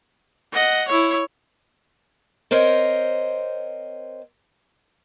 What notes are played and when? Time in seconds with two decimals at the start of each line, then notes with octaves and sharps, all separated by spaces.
0.53 D#5 F#5
0.88 E4 C#5
2.51 C4 A#4 C5 C#5 D#5